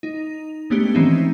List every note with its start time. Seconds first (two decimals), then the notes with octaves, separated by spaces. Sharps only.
0.03 D#4
0.70 G#3 A3 B3 C#4 D4 G4
0.94 D#3 E3 C4 C#4 D#4 E4